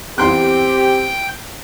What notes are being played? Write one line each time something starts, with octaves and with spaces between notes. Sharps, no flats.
E2 C4 G4 G5 C6 F#6